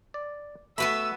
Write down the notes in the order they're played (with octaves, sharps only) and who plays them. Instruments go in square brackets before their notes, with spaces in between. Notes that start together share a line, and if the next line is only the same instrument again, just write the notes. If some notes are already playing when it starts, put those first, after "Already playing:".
[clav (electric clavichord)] D5
[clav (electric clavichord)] A3 F#4 [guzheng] B3 B4 B5 [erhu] E6